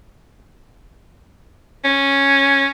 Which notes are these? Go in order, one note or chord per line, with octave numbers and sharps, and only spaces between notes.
C#4